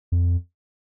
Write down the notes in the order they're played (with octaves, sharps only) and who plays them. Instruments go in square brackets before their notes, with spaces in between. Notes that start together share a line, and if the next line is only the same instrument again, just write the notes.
[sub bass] F2